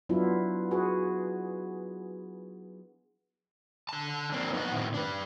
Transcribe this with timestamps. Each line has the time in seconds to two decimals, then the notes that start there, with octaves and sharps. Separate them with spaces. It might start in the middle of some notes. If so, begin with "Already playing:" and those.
0.09 F#3 B3 D4 E4 F4
0.71 F#4 G#4 B4
3.89 D3 A5
4.32 A#3 C4 D4
4.53 B3 D#4 E4 B4 F#5
4.72 A2 D#3 C4 E4
4.94 D4 B4